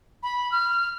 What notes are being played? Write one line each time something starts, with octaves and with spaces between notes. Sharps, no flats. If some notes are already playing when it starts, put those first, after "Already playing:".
B5
F6